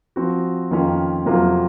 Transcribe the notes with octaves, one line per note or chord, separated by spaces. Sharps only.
F3 C4 F#4
F2 D#3 A#3 C#4 F4
F2 C3 F#3 A#3 F4